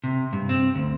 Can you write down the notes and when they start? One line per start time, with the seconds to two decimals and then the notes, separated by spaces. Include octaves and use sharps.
0.04 C3
0.33 G2
0.49 C4
0.75 D2